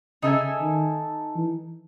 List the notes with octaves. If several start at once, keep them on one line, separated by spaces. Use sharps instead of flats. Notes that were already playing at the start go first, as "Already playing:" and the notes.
C#3 D#4 A4 E5 G#5
D#3
E3